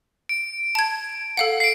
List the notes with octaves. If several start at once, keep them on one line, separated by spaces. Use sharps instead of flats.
D7
A5 G#6
A4 F5 F#5
C7 D7